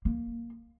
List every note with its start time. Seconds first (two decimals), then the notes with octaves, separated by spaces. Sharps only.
0.05 A#3